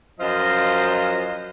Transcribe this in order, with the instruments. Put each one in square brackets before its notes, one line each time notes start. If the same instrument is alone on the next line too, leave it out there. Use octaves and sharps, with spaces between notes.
[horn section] F#2 F3 F4 C5 D#5